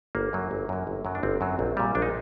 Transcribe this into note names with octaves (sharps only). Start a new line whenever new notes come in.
G1 A#3
F#2 F#3
G1
F#2 F#3
G1
F#2 F#3
D4
G1 C4
F#2 F#3
A#1
A#2 G3
A#1 D4
D#4